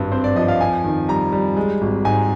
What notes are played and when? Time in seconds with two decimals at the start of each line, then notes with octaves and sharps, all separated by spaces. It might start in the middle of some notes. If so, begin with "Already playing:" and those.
Already playing: G#1 G2 C4
0.12 C4 C5
0.24 D5
0.36 F3 D#5
0.48 F5
0.61 F2 G#5
0.84 D#3
1.08 G3 A#5
1.32 G3
1.57 G#3
1.81 G#1
2.05 G#2 G#5